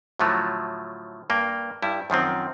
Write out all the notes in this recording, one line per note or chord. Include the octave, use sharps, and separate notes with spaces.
A2 D3 F3 F#3 A3
G2 A#3 G5
G2 G3 E4
F#2 D#3 F3 C4